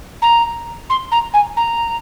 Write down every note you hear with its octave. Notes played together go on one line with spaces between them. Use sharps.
A#5
C6
A#5
G#5
A#5